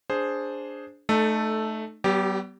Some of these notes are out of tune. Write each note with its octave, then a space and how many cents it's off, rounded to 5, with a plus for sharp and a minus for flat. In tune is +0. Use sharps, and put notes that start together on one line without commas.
D4 -10 G#4 +0 C5 +0
A3 -10 D#4 -35 A4 +0
G3 -45 B3 +0 G4 +0